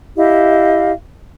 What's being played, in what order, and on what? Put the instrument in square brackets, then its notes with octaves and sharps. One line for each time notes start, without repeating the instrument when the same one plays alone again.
[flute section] E4 G4 D#5 F5